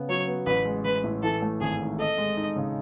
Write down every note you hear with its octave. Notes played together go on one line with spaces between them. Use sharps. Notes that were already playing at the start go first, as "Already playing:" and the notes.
Already playing: C#3 B3
F#3 C#5
B3
A1 B4
G#3
A1 B4
A2
E3 A4
A3
G#1 G#4
G#2
A4 D#5
G#3
D#4
C#3